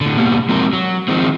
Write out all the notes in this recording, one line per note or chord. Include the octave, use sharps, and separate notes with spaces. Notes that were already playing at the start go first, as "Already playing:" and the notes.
A2 D3
B2 G3 A#3 B3
F3 G#3 C4 F#4 A#4
F#3
D#3 F3 G#3 C4